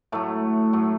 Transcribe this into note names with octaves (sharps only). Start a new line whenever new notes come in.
A2 F#3 A3
A2 F#3